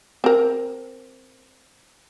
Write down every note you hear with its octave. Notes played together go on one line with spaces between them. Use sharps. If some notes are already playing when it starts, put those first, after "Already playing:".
C4 A#4